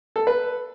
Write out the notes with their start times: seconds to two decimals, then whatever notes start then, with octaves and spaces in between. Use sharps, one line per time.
0.16 A4
0.27 B4